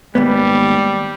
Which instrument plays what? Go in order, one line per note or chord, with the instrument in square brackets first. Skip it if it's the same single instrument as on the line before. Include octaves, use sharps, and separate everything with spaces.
[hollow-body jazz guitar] D#2 G#2 B3 [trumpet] G3